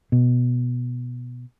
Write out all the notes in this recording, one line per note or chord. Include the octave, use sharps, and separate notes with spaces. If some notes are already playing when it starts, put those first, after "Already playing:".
B2